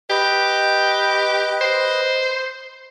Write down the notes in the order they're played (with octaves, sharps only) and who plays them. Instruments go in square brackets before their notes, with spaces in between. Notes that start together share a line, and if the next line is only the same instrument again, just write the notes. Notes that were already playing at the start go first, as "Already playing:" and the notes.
[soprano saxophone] G4 [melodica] B4 D#5
[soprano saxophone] C5